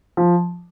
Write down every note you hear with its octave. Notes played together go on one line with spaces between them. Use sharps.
F3